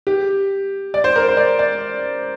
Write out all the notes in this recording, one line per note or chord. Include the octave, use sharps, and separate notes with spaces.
G4
D5
C5
A#4
C5
D5
D5